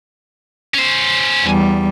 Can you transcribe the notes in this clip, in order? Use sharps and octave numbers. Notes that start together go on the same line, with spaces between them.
C#4 C5
E2 G3